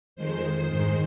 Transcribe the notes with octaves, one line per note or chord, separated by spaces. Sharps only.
F2 D#3 G#3 C5
G#2 D#3 G#3